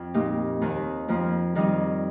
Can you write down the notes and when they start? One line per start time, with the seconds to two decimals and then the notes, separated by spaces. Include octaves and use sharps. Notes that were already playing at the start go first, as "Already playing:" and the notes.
Already playing: F2
0.14 A#2 A#3 D#4 G4
0.61 D#2 D#3 C4
1.09 F2 F3 A#3
1.55 F2 D#3 G3 D#4